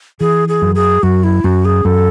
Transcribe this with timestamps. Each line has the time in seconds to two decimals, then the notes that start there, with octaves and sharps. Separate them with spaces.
0.20 E3 G#4
0.48 G#4
0.62 F#2
0.75 G#4
1.03 F#2 F#4
1.24 E4
1.44 F#2 F#4
1.65 G#4
1.85 F#2 A4